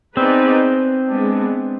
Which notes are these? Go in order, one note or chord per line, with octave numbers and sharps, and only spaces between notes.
B3 C4 D#4 G#4 B4 D5
G#3 B3 D4